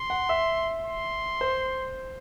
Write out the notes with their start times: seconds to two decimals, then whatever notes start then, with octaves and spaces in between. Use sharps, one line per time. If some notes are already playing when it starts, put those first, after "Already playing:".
Already playing: C6
0.10 F#5
0.29 E5
0.85 C6
1.41 C5